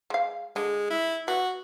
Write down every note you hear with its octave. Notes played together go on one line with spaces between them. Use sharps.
G#3 F5
D3 G#3
E4
B3 F#4